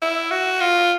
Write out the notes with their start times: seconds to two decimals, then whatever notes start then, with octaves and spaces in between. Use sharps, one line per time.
0.02 E4
0.31 F#4
0.61 F4